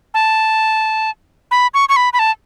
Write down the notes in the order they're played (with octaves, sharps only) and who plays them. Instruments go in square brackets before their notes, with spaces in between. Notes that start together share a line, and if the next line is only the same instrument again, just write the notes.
[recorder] A5
B5
C#6
C#6
B5
B5
A5